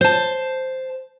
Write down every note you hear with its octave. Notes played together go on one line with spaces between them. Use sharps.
C5 A5